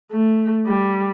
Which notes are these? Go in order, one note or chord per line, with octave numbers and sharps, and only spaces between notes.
A3
G3